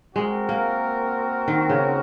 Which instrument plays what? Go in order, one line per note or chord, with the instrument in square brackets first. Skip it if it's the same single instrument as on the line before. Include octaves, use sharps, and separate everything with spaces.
[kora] G#3 [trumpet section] C4 F#4 A#4
[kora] A#3
D#3
C#3